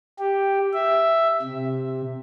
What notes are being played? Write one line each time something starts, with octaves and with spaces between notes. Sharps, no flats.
G4
E5
C3